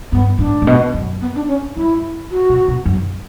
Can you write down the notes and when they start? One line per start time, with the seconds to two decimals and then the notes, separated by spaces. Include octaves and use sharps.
0.12 G2 B3
0.39 A2 D4
0.62 A2
0.67 B2
0.94 F#2
1.21 B3
1.35 D4
1.48 C#4
1.76 G2 E4
2.31 F#4
2.49 B2
2.68 B2
2.85 F#2